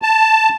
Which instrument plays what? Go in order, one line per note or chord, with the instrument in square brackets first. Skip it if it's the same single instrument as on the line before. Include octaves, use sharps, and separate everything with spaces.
[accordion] A5